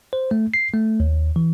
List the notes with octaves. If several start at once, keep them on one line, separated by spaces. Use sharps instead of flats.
C5
A3
C7
A3
D#2
E3